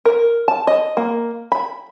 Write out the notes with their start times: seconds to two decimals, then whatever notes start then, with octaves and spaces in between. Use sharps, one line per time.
0.05 A#4
0.48 A5
0.67 D#5
0.97 A#3
1.52 B5